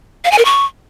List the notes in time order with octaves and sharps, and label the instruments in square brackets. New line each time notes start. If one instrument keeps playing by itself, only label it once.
[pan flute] F5
G#5
A#4
C#6